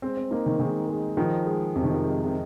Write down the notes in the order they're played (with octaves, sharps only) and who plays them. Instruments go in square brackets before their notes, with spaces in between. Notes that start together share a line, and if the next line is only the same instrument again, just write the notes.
[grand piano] G#3 [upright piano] C4
[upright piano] C4
[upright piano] A#3 [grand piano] D#4
[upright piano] D#3
[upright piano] D#3 [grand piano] G#3
[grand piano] G#3
[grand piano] D#3 [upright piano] F3
[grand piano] G#3
[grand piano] F2 [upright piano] C3
[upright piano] D#3
C3
[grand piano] G#3
[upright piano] C3